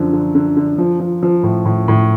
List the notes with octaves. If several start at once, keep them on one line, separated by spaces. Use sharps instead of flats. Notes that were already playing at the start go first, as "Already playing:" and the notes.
Already playing: F#2 D3 F3
D3
D3
D3
F3
F3
F3
A2
A2
A2